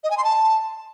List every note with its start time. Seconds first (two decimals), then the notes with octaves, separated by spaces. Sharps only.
0.04 D#5
0.11 G#5
0.17 C6
0.24 A5